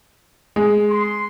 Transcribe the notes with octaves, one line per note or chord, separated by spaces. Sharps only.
G#3
C6